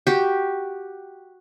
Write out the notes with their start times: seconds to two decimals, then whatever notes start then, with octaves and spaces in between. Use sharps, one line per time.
0.07 F#4 G4